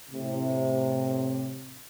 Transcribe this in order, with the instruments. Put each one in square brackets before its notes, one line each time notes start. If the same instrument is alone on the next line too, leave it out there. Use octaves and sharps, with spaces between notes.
[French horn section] A2 C3